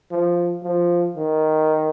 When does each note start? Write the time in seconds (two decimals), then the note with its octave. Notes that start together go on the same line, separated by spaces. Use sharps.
0.11 F3
0.63 F3
1.17 D#3